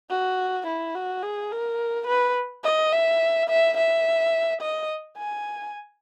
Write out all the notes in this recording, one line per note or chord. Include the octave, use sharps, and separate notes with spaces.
F#4
E4
F#4
G#4
A#4
B4
D#5
E5
E5
E5
D#5
G#5